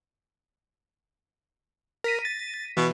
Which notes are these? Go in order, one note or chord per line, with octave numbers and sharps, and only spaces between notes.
A#4 A#6 B6 D#7
A6
B2 E3